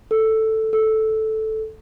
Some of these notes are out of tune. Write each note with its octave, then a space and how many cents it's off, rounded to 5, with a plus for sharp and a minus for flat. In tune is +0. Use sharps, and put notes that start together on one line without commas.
A4 +5
A4 -5